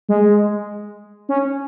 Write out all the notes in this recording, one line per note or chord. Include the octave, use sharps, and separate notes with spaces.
G#3
C#4